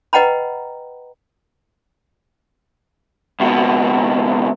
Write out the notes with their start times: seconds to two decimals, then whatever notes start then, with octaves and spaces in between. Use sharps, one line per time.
0.13 B4 D#5 F#5 G5 A#5 B5
3.40 C#2 B2